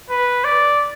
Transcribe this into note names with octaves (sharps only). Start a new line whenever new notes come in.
B4
D5